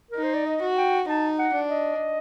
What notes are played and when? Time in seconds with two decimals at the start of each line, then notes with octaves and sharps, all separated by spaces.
0.11 D#4 A#4
0.23 C5
0.34 D5
0.46 D#5
0.62 F#4
0.77 G5
1.08 D#4 A5
1.39 F#5
1.54 D4
1.70 D#5